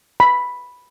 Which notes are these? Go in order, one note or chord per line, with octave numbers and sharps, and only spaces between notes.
B5